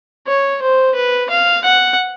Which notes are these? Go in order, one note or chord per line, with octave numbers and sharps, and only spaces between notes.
C#5
C5
B4
F5
F#5